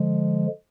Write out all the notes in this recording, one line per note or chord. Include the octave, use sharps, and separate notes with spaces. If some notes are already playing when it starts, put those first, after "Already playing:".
Already playing: D3 F3 G#3